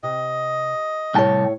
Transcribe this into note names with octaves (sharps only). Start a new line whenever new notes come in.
C3 D#5
C2 A2 C#5 G5 A5